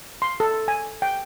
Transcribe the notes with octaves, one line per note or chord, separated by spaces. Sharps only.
C6
A4
G#5
G5